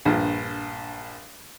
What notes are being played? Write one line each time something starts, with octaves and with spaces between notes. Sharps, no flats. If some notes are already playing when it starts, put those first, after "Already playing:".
A#1 G2